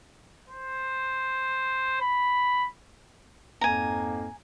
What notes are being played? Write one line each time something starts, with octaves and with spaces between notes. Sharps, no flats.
C5
B5
F2 G#2 A#3 G#5 A#5